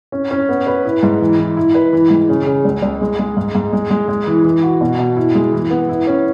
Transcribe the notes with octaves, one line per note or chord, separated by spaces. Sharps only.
C#4
C#4
B3
B4
E4
G#2
E3
E3
E4
B4
E3
G#2
C#3
C#3
C#2
C#2
G#3
G#3
G#2
G#2
G#3
G#3
G#3
E3
E3
F#4
B2
B2
E4
G#3
E3
B3
E4
C#4